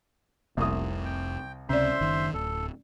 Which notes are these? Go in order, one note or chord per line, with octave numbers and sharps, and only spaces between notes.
F1 C2 D#6
G5
C#2 C3 C#4 C5 D5 E5 C6
F#1 D#3
D1 A4